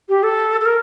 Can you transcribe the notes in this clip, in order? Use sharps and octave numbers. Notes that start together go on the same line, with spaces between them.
G4
A4
A4
A#4